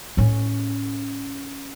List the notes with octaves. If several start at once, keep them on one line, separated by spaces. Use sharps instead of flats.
A2 C#4